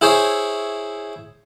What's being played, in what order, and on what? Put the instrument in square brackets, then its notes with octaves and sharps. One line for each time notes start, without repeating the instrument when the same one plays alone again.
[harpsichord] E4 G#4 C5 C#5